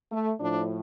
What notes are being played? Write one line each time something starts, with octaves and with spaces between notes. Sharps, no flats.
A3
A2 F3 D4